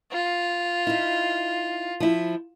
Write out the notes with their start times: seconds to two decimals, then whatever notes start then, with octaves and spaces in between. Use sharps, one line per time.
0.12 F4
0.87 D#4 E4
2.00 F3 E4